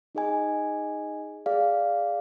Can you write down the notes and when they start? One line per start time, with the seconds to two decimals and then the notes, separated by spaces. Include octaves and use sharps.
0.15 D#4 G#4 D#5 G#5
1.46 G#4 D5 F5